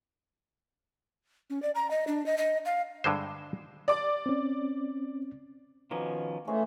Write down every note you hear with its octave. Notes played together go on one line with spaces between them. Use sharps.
C#4
D5
A#5
D#5
D4
D#5
D#5
F5
G2 D3 G#3 C5
D5 D6
C4 C#4
B2 D#3 F3 A#3 C#4
E3 G#3 A3 C#4 C5